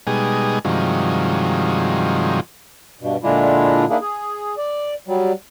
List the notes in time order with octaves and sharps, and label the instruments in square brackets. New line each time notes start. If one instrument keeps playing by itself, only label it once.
[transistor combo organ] B2 G3 G#3 D#4 G#4
G2 C3 D#3 F3 F#3 G#3
[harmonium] G2 B2
A#2 D3 G#3 D4 E4 F4
D#3 A#3 D4 E4 G#4
G#4
D5
F#3 G3